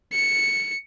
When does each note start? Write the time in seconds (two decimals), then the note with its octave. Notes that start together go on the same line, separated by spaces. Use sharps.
0.13 C#7